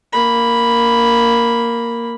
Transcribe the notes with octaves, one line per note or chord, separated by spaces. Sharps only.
A#3 B5